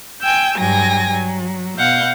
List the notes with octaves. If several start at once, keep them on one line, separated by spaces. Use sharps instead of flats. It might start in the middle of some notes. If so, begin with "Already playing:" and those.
G5 G#5 E6 G6
G2 F#3 G5 G#5 A#6
F#3
B2 F5 F#5 G6